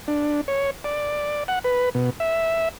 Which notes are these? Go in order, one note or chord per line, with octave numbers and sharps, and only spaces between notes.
D4
C#5
D5
F#5
B4
B2
E5